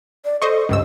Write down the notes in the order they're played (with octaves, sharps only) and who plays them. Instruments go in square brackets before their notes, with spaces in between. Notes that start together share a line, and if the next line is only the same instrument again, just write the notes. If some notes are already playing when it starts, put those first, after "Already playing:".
[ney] D5
[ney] A4 [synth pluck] C5 D#5 C#6
[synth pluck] C#2 G2 E6 [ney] D#5